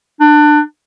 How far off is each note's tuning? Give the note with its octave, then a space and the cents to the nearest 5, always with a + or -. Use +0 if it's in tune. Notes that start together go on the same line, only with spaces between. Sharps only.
D4 +25